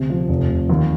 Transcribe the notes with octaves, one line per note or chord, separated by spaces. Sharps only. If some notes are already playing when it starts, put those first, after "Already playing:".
Already playing: D2 C3
F3
F1
F1
D#2